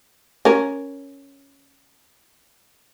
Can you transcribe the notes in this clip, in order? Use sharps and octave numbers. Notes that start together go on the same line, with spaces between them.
C#4 A#4